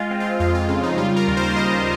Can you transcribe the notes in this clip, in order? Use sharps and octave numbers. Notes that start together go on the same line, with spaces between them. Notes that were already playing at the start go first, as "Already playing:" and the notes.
Already playing: G#3 F4
C4
F4
F2 F4
F4
C#3 F4
D#4
G3 F4
A#4
D#2
C5
D#2 D#5